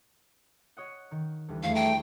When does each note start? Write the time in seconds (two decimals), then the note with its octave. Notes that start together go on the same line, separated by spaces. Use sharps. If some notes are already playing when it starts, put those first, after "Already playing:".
0.77 C#5 D#5 F#5
1.11 D#3
1.48 D2 E3 G3
1.63 E2 A3 C#5 F5 D7
1.75 D5 G5 A#5